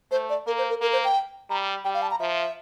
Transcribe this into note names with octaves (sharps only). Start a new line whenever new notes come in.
A3 C5
D5
A#3 A#4
C5
A#4
A#3 A#4
C5
G5
G3 A#5
G3 G5
F5
A5
A#5
F3 E5